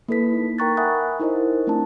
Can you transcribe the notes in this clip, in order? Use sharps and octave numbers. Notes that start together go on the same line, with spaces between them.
A#3 E4 A4 B4 B6
A#3 D#4
A#4 G5 A#5 C#6 F#6 A6
E5 F#5 G#5 B5 D#6 F#6
D#4 E4 A#4 C5 D#5
A3 C4 D4 E4 A5